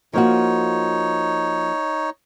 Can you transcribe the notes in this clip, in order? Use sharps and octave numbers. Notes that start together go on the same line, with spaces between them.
F3 A#3 D#4 F#4 C#5